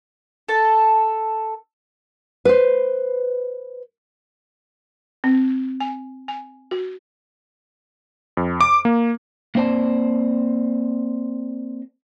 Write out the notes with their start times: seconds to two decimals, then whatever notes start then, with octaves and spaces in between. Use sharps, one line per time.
0.49 A4 A5
2.45 B4 C5
5.24 C4
5.80 G#5
6.28 G#5
6.71 F#4
8.37 F2
8.61 D6
8.85 A#3
9.55 A#3 C4 C5 D5 A5